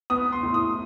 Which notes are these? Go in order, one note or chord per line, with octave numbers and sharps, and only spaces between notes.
B3 D#6
C6
A2
D#6